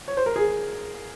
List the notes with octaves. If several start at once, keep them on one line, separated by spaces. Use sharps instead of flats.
C#5
C5
A#4
G#4